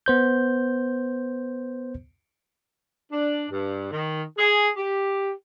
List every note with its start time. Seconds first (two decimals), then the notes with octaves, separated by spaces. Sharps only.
0.06 B3 C5 G6
3.12 D4
3.51 G2
3.92 D#3
4.38 G#4
4.77 G4